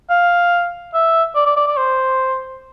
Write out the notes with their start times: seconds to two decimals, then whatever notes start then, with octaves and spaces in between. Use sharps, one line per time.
0.10 F5
0.94 E5
1.35 D5
1.46 D5
1.56 D5
1.67 D5
1.77 C5